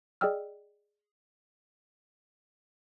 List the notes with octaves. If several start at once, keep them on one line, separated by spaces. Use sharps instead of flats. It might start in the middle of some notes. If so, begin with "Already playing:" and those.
G#4 D5 D#5 G5 E6 F6